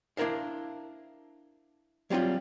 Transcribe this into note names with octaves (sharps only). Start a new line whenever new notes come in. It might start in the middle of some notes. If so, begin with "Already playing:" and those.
D4 E4 A#4 C5 F5
F#3 G3 C4 D#4 F4